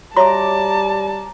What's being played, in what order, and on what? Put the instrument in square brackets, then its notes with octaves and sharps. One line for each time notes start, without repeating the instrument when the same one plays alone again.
[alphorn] G3 [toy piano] F#4 C#5 E5 [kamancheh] A5 [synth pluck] A#5 D6